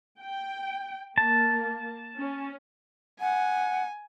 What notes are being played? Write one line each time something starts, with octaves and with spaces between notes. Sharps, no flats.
G5
A#3 A5
C#4
F#5 G#5